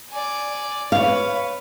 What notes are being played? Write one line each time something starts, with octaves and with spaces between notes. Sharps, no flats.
D5 G#5
B4 C#5 F5